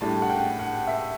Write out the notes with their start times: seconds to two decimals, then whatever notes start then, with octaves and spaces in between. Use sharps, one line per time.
0.01 A2 G3 D4 A5
0.22 F#5
0.30 G5
0.60 F#5
0.87 E5